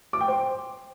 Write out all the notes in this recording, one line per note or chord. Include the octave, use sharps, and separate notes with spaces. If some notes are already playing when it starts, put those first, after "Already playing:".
D6
G5
C5